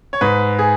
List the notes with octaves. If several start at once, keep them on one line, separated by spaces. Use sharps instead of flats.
C#5
G#2 B4
G#4